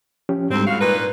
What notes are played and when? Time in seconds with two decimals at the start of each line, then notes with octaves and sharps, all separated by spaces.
0.29 F3 C#4 G4
0.50 D2 G#2 G3 G#3 C4
0.67 A2 F#4 F5
0.80 A#2 D#4 B4